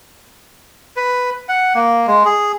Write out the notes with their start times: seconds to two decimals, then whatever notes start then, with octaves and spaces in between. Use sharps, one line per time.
0.96 B4
1.49 F#5
1.75 A#3
2.07 G#3
2.25 G#4